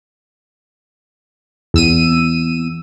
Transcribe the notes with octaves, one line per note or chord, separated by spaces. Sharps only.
E2 E6 D#7